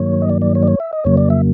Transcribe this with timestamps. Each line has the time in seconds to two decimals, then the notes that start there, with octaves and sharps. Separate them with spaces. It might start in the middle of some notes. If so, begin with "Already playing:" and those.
Already playing: G2 D#3 F#3 A#3 C#5
0.22 D#5
0.30 D5
0.42 D5
0.55 C#5
0.63 D5
0.68 C#5
0.80 E5
0.93 D#5
1.04 F2 C#3 F#3 A#3 C#5
1.17 D5
1.30 E5